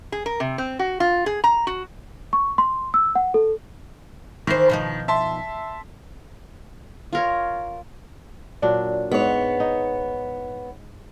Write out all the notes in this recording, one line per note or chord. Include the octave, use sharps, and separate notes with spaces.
G#4
A#4
C3
C4
F#4
F4
G#4
A#5
F#4
C#6
C6
E6
F#5
A4
D#3 E3 C5
B2 F3 D#4
E5 A5 C6
F4 A#4 C#5
A#2 F#3 D4
G#2 B3 C#5
D#4